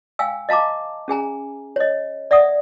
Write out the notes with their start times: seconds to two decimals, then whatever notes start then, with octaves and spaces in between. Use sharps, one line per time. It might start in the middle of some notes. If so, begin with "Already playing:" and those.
0.19 F5 G5 G#5 E6
0.49 D#5 F5 A5 A#5 D6
1.08 C#4 G#4 G#5 A#5
1.76 C#5 D#5
2.31 D5 E5 F#5 D#6